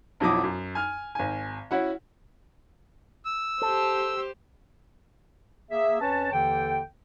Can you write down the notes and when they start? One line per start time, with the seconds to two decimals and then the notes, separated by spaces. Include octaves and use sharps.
0.20 B1 F2 F#3 E4 D6 D#6
0.44 F#2
0.75 G#5 F6
1.15 G#1 G#5
1.71 C#4 E4 F#4 F#5
3.25 E6
3.62 G4 A4 C5
5.71 A#3 G#4 E5
6.01 F2 C#4 B4 C#5 A5
6.32 D#2 D3 E3 A4 G5